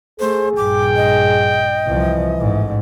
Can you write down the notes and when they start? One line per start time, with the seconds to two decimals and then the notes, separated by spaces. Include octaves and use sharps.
0.20 A3 G#4 C5
0.57 A#1 G2 G5 D6
0.96 D#5
1.86 C2 E3 F3
2.38 A1 G#2